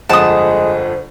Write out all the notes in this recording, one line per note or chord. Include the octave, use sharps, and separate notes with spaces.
G1 F2 G#3 C5 F#5 A5 D#6